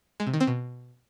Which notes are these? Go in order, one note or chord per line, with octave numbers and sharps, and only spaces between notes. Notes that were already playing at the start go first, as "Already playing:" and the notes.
G#3
C3
D#3
C4
B2